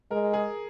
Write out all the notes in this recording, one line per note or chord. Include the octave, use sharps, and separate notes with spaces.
G#3 A#4
G#4